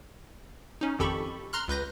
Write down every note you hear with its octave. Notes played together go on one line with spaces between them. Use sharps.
C#4 D#4
G#1 F2 G4 A4 B5 C#6
A#5 C6 F6 F#6
C#2 B4 G6 A#6